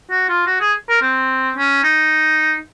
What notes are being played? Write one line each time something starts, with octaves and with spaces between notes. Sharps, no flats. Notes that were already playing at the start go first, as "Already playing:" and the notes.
F#4
F4
F#4
G#4
A#4
C4
C#4
D#4